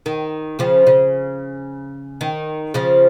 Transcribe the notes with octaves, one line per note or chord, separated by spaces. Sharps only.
D#3
C#3 F3
C#3
D#3
C#3 F3